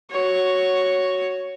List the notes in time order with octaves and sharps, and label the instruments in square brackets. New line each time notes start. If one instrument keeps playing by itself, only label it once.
[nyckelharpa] F#4 C#5